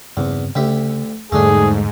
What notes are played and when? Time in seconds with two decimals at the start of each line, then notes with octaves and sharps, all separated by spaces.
0.17 E2 G2 C#3 C4
0.55 D2 C#3 G4 E5
1.32 E2 G#2 D3 G3 A3 D4 G#4